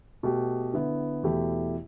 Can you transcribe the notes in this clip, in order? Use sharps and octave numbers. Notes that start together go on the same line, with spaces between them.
B2 A3 G4
D3 B3 E4
E2 B2 A3 E4 G4